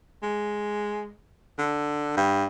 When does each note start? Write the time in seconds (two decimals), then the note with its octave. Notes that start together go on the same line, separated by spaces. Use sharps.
0.23 G#3
1.58 D3
2.17 G2